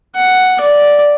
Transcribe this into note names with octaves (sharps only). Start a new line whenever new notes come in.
F#5
D5